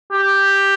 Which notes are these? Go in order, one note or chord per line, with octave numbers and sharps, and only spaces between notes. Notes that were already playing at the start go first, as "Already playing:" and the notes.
G4